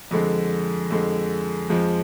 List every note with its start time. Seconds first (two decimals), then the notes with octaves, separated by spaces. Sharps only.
0.11 F2 D3 G#3
0.90 F2 D3 G#3
1.70 F2 F3 G#3